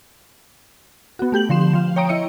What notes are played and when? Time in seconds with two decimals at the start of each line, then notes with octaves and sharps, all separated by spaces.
1.19 B3 F#4
1.32 A3 G4 G6 F#7
1.49 D3 F3 C6 E7
1.73 F3 F5
1.96 C#5 G5 A#5 D#6 D7
2.09 E4 D#5 C#7